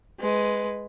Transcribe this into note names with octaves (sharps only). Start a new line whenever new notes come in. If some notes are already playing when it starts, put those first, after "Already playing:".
G#3 B4